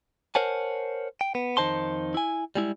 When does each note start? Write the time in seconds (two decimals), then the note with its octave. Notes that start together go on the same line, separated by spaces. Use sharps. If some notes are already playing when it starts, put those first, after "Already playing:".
0.35 A#4 C5 C#5 F#5 G#5 A5
1.21 G5
1.35 B3
1.57 F2 D#3 D#4 C5 A5 C6
2.14 E4 G#5
2.55 G3 G#3 E4